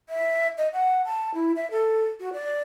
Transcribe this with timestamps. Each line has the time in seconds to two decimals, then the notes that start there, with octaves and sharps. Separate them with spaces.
0.09 E5
0.58 D#5
0.73 F#5
1.05 A5
1.34 E4
1.56 E5
1.71 A4
2.20 F#4
2.33 D5